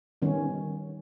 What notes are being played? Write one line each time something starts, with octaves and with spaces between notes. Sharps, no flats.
D#3 G3 B3 C#4